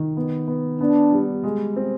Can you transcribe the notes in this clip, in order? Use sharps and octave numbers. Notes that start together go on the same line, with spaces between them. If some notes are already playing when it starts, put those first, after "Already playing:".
Already playing: D#3
B3
B3
B3 D4
G3
G#3
C4